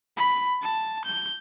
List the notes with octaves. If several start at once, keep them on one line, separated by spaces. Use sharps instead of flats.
B5
A5
G6